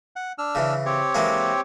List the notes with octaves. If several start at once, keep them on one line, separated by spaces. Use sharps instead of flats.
F#5
D4 E6 F6
C#3 E3
C4 G4 C#5
E3 G#3 A#3